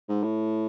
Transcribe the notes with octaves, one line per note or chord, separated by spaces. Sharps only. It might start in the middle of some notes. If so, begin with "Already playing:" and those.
G#2
A2